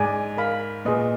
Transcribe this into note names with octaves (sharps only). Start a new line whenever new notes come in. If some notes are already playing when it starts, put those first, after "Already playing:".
Already playing: G#2 G#4 D5 G#5
A#4 F5 B5
A#2 G#4 B4 D#5